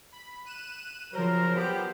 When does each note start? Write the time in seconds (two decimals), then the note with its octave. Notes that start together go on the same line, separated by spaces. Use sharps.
0.12 B5
0.45 F#6 D#7 E7
1.13 C#3 F3 F#3 A#4 C5
1.56 F#3 B3 G4